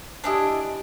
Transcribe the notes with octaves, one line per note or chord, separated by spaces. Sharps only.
D4 E4 G4 D#5 G#5 A5